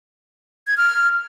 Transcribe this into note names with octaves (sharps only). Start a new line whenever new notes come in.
G#6
F6